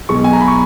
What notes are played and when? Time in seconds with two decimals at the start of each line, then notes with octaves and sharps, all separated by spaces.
0.09 B1 B2 G#3 C#6
0.24 G#5
0.33 A#5
0.41 B5
0.48 C#6